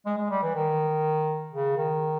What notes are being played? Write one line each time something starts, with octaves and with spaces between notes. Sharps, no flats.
G#3
G#3
G3
E3
D#3
C#3
D#3